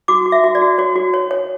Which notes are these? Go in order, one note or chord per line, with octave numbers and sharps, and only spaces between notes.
F#4 D6
F#4
E5
F#4
D5
F#4
F#4 C#5
F#4
C#5
C#5